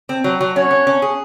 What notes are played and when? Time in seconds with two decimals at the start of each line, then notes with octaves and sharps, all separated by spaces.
0.09 C4
0.24 F#3
0.41 F#3
0.56 C#4 C#5
0.71 C#4
0.87 C#4
1.02 G#4